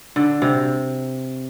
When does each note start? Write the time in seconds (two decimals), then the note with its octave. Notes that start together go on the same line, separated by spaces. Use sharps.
0.16 D3
0.42 C3